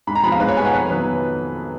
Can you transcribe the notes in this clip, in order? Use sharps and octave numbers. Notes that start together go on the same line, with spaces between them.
G#2 B5
A#5
F3 G#3 B3 B5
F5
G#2 B4
C#5
F3 G#3 B3 G#5
F#5
F2 B4
D#3 F#3 B3 B4